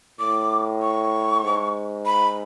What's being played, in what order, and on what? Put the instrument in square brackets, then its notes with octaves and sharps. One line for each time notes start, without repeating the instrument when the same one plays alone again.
[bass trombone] A2 [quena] D6
[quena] C#6
[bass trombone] G#2
[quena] B5